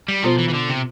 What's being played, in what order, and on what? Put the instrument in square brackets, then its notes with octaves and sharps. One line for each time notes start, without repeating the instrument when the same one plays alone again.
[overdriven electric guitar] G3
[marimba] B2 B3 F4 C5 [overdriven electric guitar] F3
[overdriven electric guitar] E3
E3
D3
C3